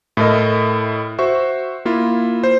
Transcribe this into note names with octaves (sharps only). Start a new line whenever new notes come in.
A2 E4 A4 A#4 D#5
F#4 C5 E5 C#6
A#3 E4 F4
C5